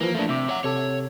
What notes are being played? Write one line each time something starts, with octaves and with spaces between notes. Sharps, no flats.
E3 F3 A#3
F3 A3 A#3 D4
C3 E5 D6
C#5 F#5
C3 A4 C#5